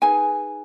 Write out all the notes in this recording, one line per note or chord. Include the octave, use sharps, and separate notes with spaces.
D#4 G#4 B4 G#5